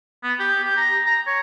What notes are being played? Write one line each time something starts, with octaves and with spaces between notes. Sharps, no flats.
B3
G4
G4
A#5
A#5
C#5